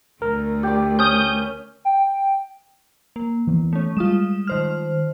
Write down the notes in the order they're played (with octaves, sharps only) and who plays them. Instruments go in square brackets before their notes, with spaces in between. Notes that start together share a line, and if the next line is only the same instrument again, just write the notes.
[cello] D2 A3 [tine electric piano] A#4
[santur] G4 D5
[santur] C#4 [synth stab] D#6 G6
[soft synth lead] G5
[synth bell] A#3
[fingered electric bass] E3 B3
[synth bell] A3 C#4
[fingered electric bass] G3 G#3 [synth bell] F4 D#6 E7
[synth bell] D#3 C5 F6